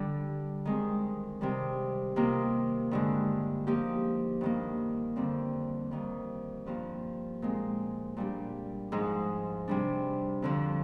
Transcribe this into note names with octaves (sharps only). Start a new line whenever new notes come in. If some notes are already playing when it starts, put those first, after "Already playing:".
Already playing: D3 G3 D4
D#3 G#3 C4
C3 D#3 G3
C3 D#3 A#3 F4
G2 D3 G#3
F3 A#3 D#4 G4
G2 D#3 A#3
F2 D3 G3 C4
F2 D#3 G3
G2 F3 A#3 F4
A#2 G#3 C4
A#2 G3 D4 G4
G#2 F3 G#3 D#4
C3 G3 D4
F2 D3 F3